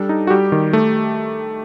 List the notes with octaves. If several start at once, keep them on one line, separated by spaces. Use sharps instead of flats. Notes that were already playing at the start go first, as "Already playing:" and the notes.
Already playing: G3 D4 A4
D#4
F#4
G3 G4
D#3
A3